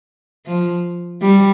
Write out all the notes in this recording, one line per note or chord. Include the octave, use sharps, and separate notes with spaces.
F3
G3